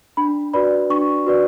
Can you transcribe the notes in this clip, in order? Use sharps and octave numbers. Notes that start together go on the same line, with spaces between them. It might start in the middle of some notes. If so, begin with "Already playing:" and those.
D4 B5
F#4 B4 D5 B5
D4 C#6
F#4 B4 D5